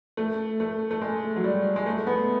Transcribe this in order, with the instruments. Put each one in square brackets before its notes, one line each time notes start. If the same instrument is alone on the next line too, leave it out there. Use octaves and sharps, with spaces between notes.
[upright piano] A3
A3
A3
G#3
F#3
G3
G#3
A3
B3